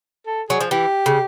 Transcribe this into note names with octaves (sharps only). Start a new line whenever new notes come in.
A4
F#3 G#4
F3
E3 G4
C#3